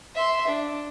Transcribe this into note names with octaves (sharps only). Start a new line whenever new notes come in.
E5 C6
D4